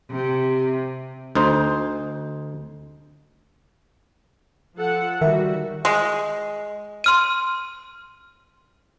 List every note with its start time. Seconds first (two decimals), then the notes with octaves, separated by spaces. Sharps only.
0.11 C3
1.35 D2 D#4 C5
4.76 F3 A4 F#5
5.21 D#3 G3 F#4 A#4 E5
5.85 G#3
7.04 C6 F6 D#7